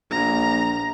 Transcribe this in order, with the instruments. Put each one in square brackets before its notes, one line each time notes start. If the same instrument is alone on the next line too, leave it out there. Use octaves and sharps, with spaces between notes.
[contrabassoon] A#1 [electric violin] A#5